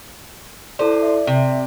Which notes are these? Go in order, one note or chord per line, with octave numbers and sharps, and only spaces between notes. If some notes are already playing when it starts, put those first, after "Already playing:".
E4 A4 C5 D5
D5 E5
C3